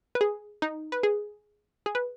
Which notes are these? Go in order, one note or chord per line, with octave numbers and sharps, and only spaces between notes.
B4
G#4
D#4
B4
G#4
G#4
B4